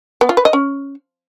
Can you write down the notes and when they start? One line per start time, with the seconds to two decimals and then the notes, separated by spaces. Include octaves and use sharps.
0.21 B3
0.29 F4
0.37 B4
0.45 D#5
0.53 C#4